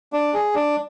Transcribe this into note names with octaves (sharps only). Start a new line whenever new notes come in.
D4
G#4
D4